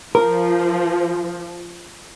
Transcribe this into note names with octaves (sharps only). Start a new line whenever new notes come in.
F3 A#4